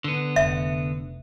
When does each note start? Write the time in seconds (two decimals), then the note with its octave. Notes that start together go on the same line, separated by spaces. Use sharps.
0.04 D3 B3
0.36 F1 E5